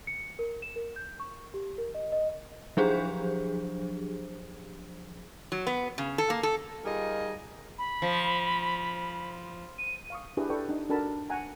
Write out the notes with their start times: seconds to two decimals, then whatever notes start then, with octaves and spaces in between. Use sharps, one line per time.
0.07 C#7
0.39 A#4
0.62 E7
0.76 A#4
0.96 G6
1.20 C#6
1.54 G4
1.78 A#4
1.95 D#5
2.12 D#5
2.77 F3 F#3 D4 G4 G#4 C5
5.52 F#3
5.67 B3
5.98 C#3
6.18 A4
6.30 A#3
6.43 A4
6.85 G3 D#4 F4 G#4 A#4 D#5
7.78 B5
8.02 F3
9.78 D#7
10.10 F5 C#6 D#6
10.37 D4 E4 G4 G#4 B4
10.49 A4 B4 D5 G5 C#6
10.69 D4 D#4
10.89 D4 F#4 A4 A#4 A5 B5
11.30 F#5 G#5 A#5